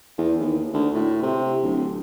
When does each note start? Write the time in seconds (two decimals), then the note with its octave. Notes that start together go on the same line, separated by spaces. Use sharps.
0.18 E2
0.40 D#2
0.73 D2
0.94 A2
1.22 C3
1.63 D1